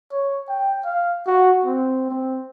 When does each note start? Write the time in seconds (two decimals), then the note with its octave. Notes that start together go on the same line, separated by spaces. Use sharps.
0.12 C#5
0.48 G5
0.85 F5
1.27 F#4
1.65 C4
2.10 C4